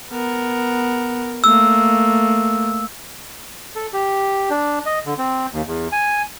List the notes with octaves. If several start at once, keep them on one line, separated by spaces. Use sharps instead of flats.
B3 A#4
A3 A#3 E6
A4
G4
D4
D#5
D3
C4
D#2
E2
G#5